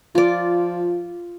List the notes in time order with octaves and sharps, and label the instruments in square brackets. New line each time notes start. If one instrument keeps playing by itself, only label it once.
[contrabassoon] F3 [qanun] F4 D5